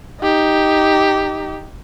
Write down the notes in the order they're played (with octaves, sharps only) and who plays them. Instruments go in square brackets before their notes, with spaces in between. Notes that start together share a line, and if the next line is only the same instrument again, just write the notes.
[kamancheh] D#4 G4